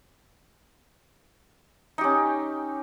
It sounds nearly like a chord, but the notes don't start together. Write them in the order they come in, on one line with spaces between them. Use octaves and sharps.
D#4 G4 C#4